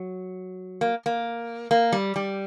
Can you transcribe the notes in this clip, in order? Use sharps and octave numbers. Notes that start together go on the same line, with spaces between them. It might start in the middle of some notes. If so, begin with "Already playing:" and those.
Already playing: F#3
A#3
A#3
A#3
G3
G3